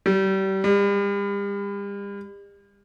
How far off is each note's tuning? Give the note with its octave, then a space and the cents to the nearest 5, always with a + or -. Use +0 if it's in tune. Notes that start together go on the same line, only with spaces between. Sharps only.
G3 -30
G3 +40